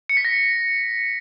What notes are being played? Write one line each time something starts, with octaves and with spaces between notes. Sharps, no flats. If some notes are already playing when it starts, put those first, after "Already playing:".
C#7
B6
A#6